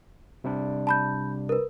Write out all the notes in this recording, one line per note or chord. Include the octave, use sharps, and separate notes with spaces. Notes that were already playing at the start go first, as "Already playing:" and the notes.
C3 G3 D4
A5 B5 G6
A#4 B4